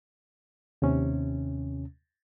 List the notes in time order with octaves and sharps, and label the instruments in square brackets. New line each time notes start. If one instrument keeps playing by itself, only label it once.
[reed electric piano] D#2 C3 C#4